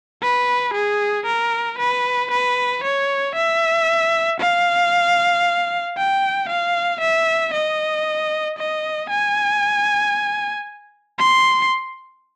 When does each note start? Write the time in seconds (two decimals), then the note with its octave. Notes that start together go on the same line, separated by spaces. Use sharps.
0.22 B4
0.74 G#4
1.26 A#4
1.79 B4
2.31 B4
2.84 C#5
3.35 E5
4.40 F5
5.97 G5
6.49 F5
7.01 E5
7.54 D#5
8.58 D#5
9.10 G#5
11.18 C6